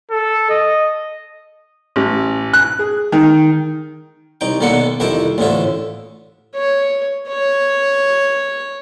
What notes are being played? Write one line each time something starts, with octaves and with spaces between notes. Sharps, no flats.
A4
D#5
A1
F#6
G#4
D#3
C2 D#4 G5
B1 D3 D#3 A#3 A4 F#5
C2 F2 D#3 E4 G5 A5
A1 D2 A2 D3 F4 E5
C#5
C#5